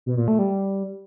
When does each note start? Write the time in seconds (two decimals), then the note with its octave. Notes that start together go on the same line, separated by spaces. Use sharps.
0.06 B2
0.17 A#2
0.28 A3
0.39 G3